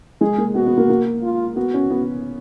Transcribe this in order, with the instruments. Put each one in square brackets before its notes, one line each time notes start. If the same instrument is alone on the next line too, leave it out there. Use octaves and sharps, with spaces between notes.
[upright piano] G#3 [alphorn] G#4
[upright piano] A#3
[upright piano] B3 [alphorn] F#4
[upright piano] B3
A#3
A#3
[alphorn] F4
[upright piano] B3 [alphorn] F#4
[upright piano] C#4
B3